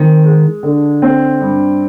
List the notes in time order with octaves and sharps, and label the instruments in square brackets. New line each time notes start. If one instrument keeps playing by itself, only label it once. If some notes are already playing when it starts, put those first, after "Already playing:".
Already playing: [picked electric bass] D#3 [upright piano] C4
[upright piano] G#3
D3
C4
G2